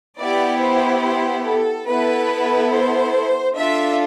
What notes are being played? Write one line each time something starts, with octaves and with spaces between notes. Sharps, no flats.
B3 E4 G4 D5
C5
C5
A4
B3 E4 A4 B4
C5
D4 F4 A4 E5